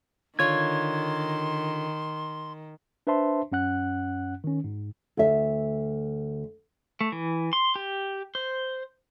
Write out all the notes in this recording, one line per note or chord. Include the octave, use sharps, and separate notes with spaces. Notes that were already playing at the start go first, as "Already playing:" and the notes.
D3 D#3 F4 C#5 C6 G#6
D4 B4 C5 E5 A5 C6
F#2 C#4 F#5 F#6
D#3 C#4
G#2
D2 E5
A3
E3
C6
G4
C5